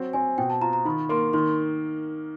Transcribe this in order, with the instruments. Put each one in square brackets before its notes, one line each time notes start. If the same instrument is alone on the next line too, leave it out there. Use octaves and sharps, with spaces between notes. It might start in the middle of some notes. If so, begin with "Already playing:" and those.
Already playing: [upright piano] F#3 C4
[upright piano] C4 [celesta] G#5
[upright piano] B2 [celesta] G5
[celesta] A5
[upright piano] F4 [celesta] A#5
[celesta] A#5
[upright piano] D#3 [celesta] B5
[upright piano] A#3 [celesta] C6
[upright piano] D#3 [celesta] C6